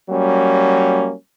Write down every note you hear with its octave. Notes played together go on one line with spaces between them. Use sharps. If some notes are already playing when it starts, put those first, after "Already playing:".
F#3 G3 A#3 C#4